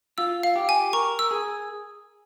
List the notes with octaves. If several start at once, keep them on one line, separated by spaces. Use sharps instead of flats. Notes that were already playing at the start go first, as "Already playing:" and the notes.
F4 E6
F5
G4
G#5
A#4 C#6
E6
G#4